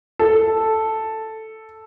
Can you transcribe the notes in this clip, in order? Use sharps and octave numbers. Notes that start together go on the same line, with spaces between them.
A4